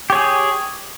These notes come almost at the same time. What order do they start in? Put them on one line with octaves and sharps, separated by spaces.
G4 C#5 G#4